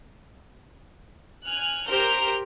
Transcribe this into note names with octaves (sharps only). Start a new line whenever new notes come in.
G#5 F6 F#6
G4 A#4 C5 A#5 F6 G6